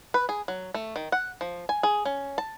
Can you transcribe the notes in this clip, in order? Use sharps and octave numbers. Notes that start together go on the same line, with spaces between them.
B4
G#4
F#3
A3
D#3
F#5
F3
G#5
G#4
C#4
A5